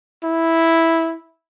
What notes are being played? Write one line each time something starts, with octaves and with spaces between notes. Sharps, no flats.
E4